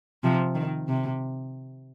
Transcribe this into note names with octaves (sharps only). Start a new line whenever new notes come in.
C3 F3
D#3
C3